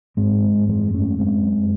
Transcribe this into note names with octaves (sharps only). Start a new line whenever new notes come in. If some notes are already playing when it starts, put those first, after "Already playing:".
G#2 G#3 C4
G#2
F#2 E3 G#3
F#2 A3 C#4
F#2 G#3 C4
F#2